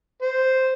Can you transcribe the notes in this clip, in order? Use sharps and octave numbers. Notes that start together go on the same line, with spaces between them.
C5